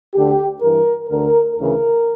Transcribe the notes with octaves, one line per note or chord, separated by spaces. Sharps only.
D2 D3 G4
G2 E3 A#4
D2 D3 A#4
D2 C#3 E3 A#4